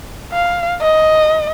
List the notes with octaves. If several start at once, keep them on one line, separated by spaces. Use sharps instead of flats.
F5
D#5